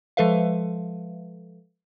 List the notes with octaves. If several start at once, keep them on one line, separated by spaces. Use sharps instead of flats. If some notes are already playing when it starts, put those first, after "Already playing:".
F3 G#3 A4 B4 E5 F5